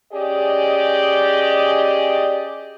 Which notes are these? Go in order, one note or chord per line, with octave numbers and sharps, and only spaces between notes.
C#4 G4 G#4 D5 D#5